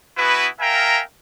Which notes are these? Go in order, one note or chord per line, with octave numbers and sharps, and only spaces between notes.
B3 E4 F#4 G#4 B4
A#4 E5 F5 G5 G#5 A#5